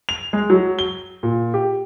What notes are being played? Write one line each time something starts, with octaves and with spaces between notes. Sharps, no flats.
F7
G#3
F#3
G7
A#2
G4